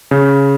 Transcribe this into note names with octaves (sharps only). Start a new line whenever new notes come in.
C#3